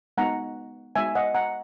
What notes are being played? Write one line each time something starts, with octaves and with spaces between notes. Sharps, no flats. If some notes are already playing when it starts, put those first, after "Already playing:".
G#3 B3 D#4 F#4 F#5 A#5
G#3 B3 D#4 F#4 E5 G#5
D#5 F#5
F#5 A#5